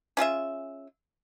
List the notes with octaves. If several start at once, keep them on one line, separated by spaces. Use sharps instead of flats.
C#4 F4 G#4 E5